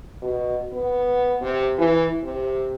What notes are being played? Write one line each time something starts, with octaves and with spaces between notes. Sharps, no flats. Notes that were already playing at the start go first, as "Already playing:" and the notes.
B2
B3
C3
E3
C3